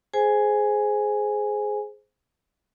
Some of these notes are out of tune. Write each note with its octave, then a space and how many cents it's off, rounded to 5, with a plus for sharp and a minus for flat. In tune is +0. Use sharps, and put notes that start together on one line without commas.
G#4 +15 C5 +0 G#5 +0